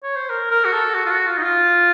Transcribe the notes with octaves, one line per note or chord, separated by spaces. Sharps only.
C#5
C5
A#4
A#4
F#4
A4
F#4
F4
F#4
F4
D#4
F4